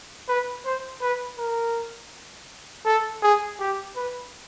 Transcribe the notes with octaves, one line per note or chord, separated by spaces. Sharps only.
B4
C5
B4
A#4
A4
G#4
G4
B4